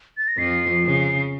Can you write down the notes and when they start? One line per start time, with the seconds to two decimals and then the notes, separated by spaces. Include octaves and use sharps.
0.17 A6
0.28 A#6
0.38 F2 F3 C7
0.86 C#3